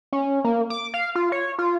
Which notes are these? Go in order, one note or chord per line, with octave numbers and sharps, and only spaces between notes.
C#4
A#3
D6
F5
F4
C#5
F4